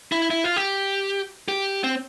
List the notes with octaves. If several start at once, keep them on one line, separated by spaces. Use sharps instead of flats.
E4
E4
F4
G4
G4
C4